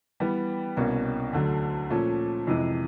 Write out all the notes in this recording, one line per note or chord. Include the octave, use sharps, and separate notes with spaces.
E3 G3 B3
C2 B2 G3 A#3 C#4
D2 D3 F#3 A3
A#2 F3 A3 C#4
F2 C3 E3 G#3